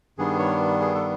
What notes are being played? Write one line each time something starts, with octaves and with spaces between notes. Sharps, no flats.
G2 D#3 G3 B3 D4 G#4
C#5
G#4
A4